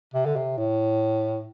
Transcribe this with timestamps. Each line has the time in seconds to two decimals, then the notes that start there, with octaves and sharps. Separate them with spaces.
0.14 C3
0.26 D3
0.36 C3
0.58 A2